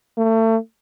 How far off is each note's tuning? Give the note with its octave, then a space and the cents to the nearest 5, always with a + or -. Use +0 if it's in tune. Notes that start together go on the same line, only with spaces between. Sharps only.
A3 +30